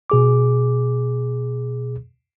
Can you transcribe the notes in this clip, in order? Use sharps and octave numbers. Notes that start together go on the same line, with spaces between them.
B2 G#4 D6